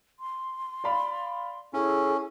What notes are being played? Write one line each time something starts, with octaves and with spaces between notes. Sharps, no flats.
C6
D5 F5 B5
C#4 E4 G#4 A4